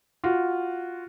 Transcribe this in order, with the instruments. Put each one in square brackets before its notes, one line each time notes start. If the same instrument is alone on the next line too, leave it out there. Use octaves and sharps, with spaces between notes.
[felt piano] F4 F#4